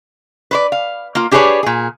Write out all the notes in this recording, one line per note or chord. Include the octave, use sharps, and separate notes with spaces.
B4 C5 D5
F5
A#3 F4
D4 G4 G#4 B4 C#5 D5
A#2 G#4